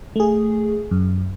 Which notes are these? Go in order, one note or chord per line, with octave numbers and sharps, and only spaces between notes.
A3 G#4
F#2